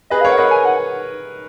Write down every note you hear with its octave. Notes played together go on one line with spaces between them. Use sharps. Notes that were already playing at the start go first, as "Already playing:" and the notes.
G#4 B4 D#5
A#4 C#5 F5
F#5
B4 D#5
G#5
F#5